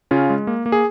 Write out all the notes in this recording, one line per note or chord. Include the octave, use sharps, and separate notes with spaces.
C#3 C#4 F4
G#3
A#3
A#3
G#4